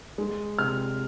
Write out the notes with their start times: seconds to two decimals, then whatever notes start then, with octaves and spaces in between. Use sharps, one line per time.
0.18 G#3
0.59 C3 F6